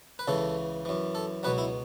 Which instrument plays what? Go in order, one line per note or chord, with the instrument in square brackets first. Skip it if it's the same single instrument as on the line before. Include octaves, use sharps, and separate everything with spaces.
[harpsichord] B4
C#2 C#3 E3 A4
F#2 E3
A4
C#2 B2 F#3 B4
E4